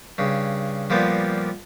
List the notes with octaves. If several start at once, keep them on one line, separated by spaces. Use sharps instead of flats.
G2 C#3
A#2 F3 G3 A#3 B3